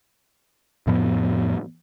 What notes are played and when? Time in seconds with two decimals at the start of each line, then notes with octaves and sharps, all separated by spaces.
0.87 F2 A2 F3 B3